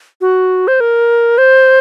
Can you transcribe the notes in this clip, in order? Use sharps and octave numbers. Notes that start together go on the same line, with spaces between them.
F#4
C5
A#4
C5